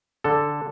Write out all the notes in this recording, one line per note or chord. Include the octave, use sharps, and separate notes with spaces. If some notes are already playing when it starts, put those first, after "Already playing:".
D3 A4